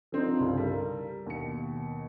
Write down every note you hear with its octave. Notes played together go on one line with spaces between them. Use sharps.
F3 C4 D4 D#4
C2 G2 C#3
G3 A4 A#4
D#2 B2 C#7